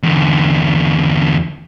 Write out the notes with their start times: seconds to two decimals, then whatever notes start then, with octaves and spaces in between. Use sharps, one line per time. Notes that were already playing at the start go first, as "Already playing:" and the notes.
0.03 E2 D3